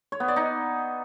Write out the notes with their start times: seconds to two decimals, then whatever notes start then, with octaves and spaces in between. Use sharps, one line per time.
0.12 C#5
0.20 B3
0.28 D5
0.36 D#4